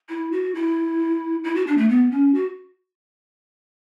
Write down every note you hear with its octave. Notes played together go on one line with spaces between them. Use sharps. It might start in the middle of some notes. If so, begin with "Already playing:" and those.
E4
F#4
E4
E4
F#4
D4
A3
B3
C#4
F#4